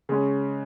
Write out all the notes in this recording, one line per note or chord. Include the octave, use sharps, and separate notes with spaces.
C#3 G#3 C#4